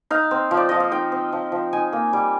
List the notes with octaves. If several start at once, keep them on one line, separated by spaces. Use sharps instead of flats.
D#4 F5
C4
F3
D5
F3 D#5
F5
D#4 G5
C4
F3
F3
D#4 G#5
A#3
G3